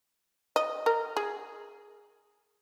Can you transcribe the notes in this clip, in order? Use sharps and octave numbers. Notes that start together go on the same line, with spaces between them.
D#5
A#4
G#4